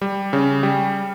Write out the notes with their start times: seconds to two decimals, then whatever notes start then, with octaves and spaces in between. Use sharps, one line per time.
0.02 G3
0.33 C#3
0.63 G3